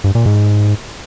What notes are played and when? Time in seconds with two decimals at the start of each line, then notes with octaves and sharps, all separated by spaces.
0.04 G2
0.15 A#2
0.26 G#2